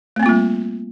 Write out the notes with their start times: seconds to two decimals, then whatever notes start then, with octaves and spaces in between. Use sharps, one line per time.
0.16 A3
0.19 C4
0.23 A#3
0.26 F4
0.29 G3